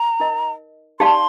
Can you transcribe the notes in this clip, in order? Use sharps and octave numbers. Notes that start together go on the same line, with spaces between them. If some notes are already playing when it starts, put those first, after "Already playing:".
Already playing: A#5
D#4 A#4 D#5
D#4 G4 D5 F5 A5 C6